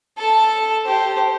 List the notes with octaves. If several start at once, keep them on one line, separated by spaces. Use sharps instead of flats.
A4 A5
G4 C5